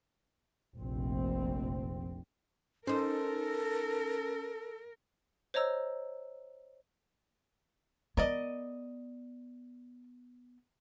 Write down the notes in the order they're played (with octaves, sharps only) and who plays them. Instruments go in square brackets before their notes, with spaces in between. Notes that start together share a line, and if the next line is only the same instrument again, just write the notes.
[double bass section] F1 A#1 C4
[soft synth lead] C#4 [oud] D#4 C5 [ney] A4 [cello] A#4
[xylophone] C5 C#5 D#5 A#5 E6
[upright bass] B3 [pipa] A#4 D5 D#5